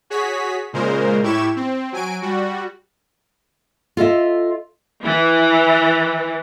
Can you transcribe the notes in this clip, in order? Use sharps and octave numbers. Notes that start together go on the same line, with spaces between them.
F#4 G#4 C#5 B6
A#2 C#3 G#3 A#4 C5
A2 E4 G4 C#6 G#6 E7
C4
F#3 G#5 D7
G3 F#4
F4 A4 D#5 E5
E3